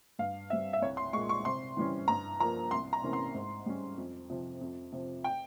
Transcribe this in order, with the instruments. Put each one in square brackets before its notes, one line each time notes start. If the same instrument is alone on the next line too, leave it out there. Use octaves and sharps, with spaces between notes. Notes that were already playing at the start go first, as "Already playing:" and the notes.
[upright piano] G2 F5
G3 C4 E5
E5
C2 C#5
C6
G#3 C#6
A#2
C#6
C3 C6
E3 G3 C#4
G2 A#5
F3 A#3 A#5
C2 C6
A#5
C3 E3 A#3 C#4
C6
G#2
G3 C#4
F2
C3 F3 C4
F2
C3 F3
G5